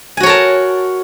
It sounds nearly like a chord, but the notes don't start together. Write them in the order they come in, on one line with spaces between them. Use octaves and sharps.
G#5 F#4 C#5 A#4 A5